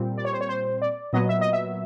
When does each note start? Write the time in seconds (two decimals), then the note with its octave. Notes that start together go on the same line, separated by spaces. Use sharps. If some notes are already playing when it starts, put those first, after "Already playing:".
Already playing: A#2 G3 C4
0.18 D5
0.25 C#5
0.33 C5
0.41 C#5
0.49 C5
0.82 D5
1.13 A#2 F#3 B3 D#5
1.29 E5
1.41 D#5
1.53 E5